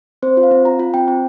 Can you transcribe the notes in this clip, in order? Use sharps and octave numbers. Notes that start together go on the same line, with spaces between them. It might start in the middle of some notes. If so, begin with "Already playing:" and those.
C4 C5
F4
F5
C4
F4 A#5
F4
C4 G5
C4